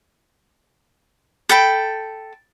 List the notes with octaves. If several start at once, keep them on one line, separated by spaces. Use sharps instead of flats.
A4 G5 B5